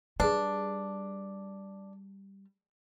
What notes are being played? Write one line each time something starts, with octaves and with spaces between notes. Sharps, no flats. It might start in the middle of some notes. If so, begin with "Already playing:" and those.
G3 D4 G#4 B4